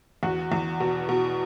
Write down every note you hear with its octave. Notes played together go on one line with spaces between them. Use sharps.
E2 F#4
E2
B2
B2